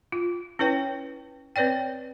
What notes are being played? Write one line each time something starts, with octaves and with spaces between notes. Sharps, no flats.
F4
C#4 E4 B4 C#5 G5
C4 B4 C#5 D5 G5